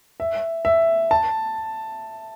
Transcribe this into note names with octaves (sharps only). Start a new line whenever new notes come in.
E5
E5
A5